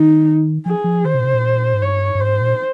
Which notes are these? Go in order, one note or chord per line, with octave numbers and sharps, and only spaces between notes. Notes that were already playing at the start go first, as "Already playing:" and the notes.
Already playing: D#3 D#4
F3 G#4
F3
D#3 C5
C3
A#2
C3
A#2
G#2
G2 C#5
G2
G#2 C5
A#2